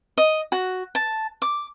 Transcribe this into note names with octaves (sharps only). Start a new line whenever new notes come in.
D#5
F#4
A5
D6